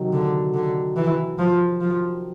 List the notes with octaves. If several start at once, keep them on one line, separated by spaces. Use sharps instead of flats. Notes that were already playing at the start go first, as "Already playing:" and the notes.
Already playing: C3 D#3 F#3
D3
D3
E3
F3
F3